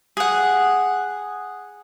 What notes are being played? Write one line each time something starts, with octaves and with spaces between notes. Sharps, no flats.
G#4 F#5